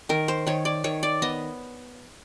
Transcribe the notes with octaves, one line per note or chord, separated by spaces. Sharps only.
D#3 A#4
C5
D#3 C#5
D5
D#3 C#5
D5
B3 D#5